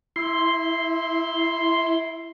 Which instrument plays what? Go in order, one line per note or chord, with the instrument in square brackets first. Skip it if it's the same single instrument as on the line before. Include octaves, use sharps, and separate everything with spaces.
[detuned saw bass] E4 [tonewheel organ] C6